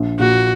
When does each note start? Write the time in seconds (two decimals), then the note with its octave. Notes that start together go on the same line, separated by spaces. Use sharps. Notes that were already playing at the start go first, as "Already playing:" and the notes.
Already playing: A#1
0.19 A#2 F#4